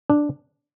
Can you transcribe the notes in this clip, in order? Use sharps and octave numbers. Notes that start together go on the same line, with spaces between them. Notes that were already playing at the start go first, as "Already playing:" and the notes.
D4